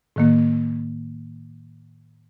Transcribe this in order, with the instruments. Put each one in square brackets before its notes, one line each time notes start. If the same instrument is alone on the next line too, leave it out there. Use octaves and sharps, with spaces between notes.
[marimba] A2 D#3 A#3